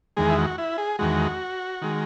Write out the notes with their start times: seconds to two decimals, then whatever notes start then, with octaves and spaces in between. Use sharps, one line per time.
0.17 E2 D#3 G#3 G#4
0.30 E4
0.37 F#4
0.58 E4
0.78 G#4
0.99 E2 D#3 G#3 F#4
1.82 D#3 G#3